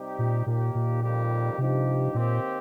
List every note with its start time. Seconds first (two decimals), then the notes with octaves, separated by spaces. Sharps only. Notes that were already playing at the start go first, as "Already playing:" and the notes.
Already playing: C3 G3 D#4 G4
0.19 A#2
0.46 D#2 A#2 D#3 A#3 G4
0.75 A#2
1.02 F2 D#3 G3 A#3 G4
1.58 G2 C3 F3 D#4 G4
2.14 D#2 A#2 D#3 C4 G4